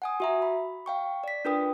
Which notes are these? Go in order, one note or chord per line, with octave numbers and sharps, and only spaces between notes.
F#5 G#5 D#6
F#4 E5 A#5
B5
F5 G5 C#6
D5 B6
D4 F4 A#4 B4 G5 D#6